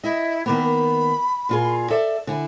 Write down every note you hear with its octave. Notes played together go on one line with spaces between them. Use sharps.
E4 D#5 E5
D#3 A#3 B3 B5
A#2 F4 G#4
A4 D5 E5
D3 E4 G#5